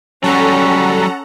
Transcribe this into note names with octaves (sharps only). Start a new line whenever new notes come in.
F#3 G3 C#4 A4 F#5 A#5